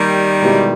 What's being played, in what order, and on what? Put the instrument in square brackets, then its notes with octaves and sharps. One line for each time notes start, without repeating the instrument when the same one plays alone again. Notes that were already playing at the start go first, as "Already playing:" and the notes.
Already playing: [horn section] D#3 G3 [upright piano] A#3 G4
[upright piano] B2 G#3 B3 E4 G4